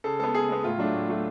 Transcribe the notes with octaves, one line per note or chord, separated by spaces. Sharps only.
C#3 A4
G#3 B3 A4
C#3 G#4
G#3 B3
A2 F4
F#3 A3 D4
A2
F#3 A3